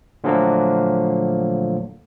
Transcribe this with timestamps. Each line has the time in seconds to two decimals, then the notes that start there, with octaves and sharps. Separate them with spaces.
0.24 A#2 D3 F3 F#3 A3 A#3